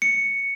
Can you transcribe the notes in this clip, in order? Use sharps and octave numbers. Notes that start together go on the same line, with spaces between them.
C#7